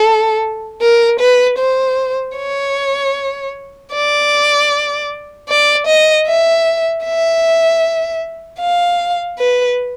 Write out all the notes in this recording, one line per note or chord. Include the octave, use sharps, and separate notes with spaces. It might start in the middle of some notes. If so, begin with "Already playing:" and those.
Already playing: A4
A#4
B4
C5
C#5
D5
D5
D#5
E5
E5
F5
B4